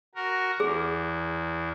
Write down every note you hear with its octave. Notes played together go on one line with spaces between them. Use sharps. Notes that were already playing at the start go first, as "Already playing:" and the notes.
F#4 A#4
E2 G#4